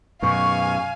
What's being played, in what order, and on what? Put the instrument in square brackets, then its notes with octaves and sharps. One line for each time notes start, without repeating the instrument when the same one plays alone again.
[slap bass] F#2 B2 [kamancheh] F5 G#5 [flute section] C#6